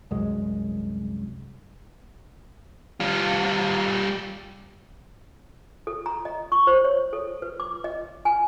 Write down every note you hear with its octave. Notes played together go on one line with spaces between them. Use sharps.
C2 F#2 G#3
G3 F4
A4
A#5
D#5
C#6
C5
C#5
A4
B4
D6
D#5
G#5